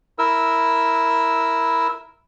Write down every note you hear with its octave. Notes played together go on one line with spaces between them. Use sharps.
E4 A#4 E6